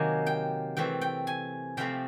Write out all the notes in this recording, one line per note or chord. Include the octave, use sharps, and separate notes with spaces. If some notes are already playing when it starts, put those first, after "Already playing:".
Already playing: C3 D#3 F#3 A#3 C4 G#5
G5
E3 A3 C4 G5
G5
G#5
C3 F3 A3 C4 G5